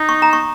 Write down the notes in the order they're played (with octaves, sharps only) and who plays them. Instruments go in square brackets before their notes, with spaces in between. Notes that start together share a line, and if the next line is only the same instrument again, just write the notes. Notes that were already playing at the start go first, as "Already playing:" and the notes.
Already playing: [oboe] D#4
[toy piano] C#6
A#5
C#6